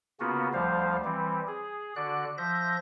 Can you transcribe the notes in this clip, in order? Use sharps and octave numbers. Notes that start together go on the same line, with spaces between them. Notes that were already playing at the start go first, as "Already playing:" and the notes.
C#3 A#3 B3 C#4 F4 F#4
D2 F3 G3 C5 F5
E3 G3 C4
G#4
D3 F#4 D5 F#6
F3 E5 G6 A#6